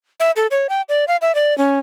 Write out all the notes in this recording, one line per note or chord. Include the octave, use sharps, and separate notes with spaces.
E5
A4
C#5
G5
D5
F5
E5
D5
C#4